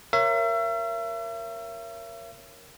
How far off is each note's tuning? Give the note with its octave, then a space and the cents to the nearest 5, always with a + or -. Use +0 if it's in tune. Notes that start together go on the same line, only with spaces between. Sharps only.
A#4 -5 C#5 -10 E5 +40